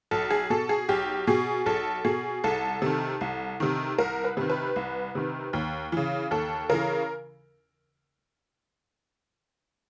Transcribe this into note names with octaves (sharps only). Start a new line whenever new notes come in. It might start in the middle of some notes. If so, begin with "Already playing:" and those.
B1 A4
G#4
B2 A4
G#4
B1 G4
B2 G#4
B1 A4
B2 G#4
C2 A4
C3 D#3
C2
C3 D#3
C2 A#4
B4
C3 D#3
B4
C2
C3 D#3
D#2
C#3 E3
D#2 A4
C#3 E3 A#4